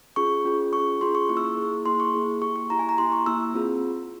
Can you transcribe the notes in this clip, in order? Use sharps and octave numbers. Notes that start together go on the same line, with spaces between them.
C#4 F4 G#4 C#6
C#4 F4 G#4
C#4 F4 G#4 C#6
C#4 F4 G#4 C6
C#6
A#3 E4 G#4 C#6
E6
C#6
A#3 E4 G#4
A#3 E4 G#4 C6
C#6
A#3 E4 G#4
A#3 E4 G4 C#6
C#6
A#3 E4 G4 A#5
G#5
A#5
A#3 E4 G4 C6
C#6
A#3 E4 G4 E6
C4 F4 G#4